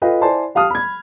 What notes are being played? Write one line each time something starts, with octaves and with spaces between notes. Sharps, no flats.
F4 A4 B4 D#5 F5 G5
E4 C5 D5 G#5 A5 C6
G4 F5 A5 D#6 F6
B5 G#6